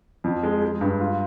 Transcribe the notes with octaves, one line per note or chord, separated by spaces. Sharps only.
F2
G#3
G#3
G2
F4